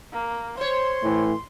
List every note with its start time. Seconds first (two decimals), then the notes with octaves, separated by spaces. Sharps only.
0.12 A#3
0.57 C5 C#5 C6
1.03 A2 E3